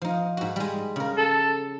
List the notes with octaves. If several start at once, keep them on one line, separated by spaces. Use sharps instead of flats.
F3 D#4
G#2 F#4
G3 G#3
C#3 A#4
A4